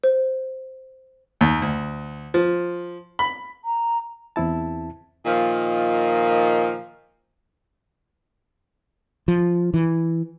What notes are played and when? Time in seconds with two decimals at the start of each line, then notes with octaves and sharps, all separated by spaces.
0.04 C5
1.41 D#2
1.62 D2
2.34 F3
3.19 B5
3.65 A#5
4.36 E2 C4 E4 A5
5.26 A#2 D#3 F3 D#5 F5
9.28 F3
9.74 E3